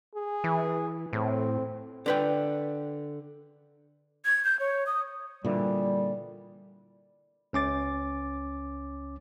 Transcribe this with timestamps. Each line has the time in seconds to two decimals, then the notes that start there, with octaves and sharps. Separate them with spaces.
0.15 G#4
0.44 E3
1.13 A2 C4
2.06 D3 B4 G5
4.25 G#6
4.45 G6
4.60 C#5
4.87 D#6
5.45 A#2 D3 E3 G3
7.53 C#2 C#4 D6 A6